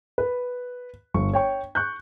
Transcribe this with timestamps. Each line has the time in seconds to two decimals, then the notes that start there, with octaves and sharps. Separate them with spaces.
0.18 B4
1.14 G1 C#6
1.33 C#5 G5 C#6
1.75 C#6 F#6 G6